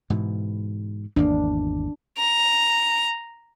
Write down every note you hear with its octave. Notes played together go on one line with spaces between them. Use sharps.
G#2 B2 E3
G#1 E2 A#3 D4
A#5